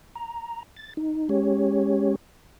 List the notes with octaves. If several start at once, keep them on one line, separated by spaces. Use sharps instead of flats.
A#5
A6
D#4
G#3 C#4 G4 C#5